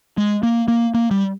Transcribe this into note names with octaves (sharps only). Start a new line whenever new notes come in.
G#3
A#3
A#3
A#3
G3